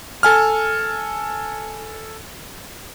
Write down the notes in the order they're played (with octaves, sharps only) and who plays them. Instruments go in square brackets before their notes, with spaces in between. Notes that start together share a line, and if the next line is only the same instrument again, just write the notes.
[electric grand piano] A4 G#5 F6